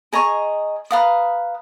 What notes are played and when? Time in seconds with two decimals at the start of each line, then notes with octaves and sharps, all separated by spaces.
0.13 G#4 D#5 A#5 C#6
0.91 B4 F5 A#5 D#6